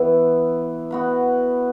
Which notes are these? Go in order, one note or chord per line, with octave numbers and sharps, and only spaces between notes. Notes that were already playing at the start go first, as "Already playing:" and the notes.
Already playing: E3 B3 E4
B3 F#4 B4